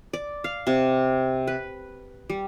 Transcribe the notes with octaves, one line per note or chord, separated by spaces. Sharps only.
D5
F5
C3
B4
G3